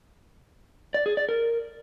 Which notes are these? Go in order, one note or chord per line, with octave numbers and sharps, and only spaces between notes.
D5
G#4
D5
A#4